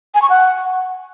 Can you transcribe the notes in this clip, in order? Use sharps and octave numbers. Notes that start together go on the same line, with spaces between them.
G#5
C#6
F#5